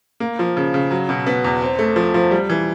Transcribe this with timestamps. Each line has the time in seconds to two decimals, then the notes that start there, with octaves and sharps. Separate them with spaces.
0.20 A#3
0.39 F3
0.57 C#3
0.74 C#3
0.91 F#3
1.09 B2
1.27 B3
1.44 E2
1.62 C4
1.79 A3
1.96 F3
2.14 F3
2.31 G3
2.50 E3